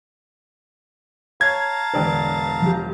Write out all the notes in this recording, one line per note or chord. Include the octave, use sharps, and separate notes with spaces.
C#5 F5 A5 A#5 G#6
E1 A1 D3 B4 D5 G5
F3 G4